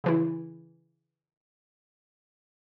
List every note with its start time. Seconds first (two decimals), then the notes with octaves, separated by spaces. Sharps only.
0.04 C#3 E3 E4